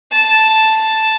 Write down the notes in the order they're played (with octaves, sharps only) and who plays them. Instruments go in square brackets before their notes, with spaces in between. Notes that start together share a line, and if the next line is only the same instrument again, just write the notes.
[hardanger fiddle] A5